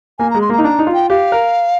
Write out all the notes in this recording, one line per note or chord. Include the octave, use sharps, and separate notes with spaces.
A#3 G#5
G#3 A#5
C6
A#3 A#5
D#4
D4 A#5
D#4
F4
G5
G4 F5
A#4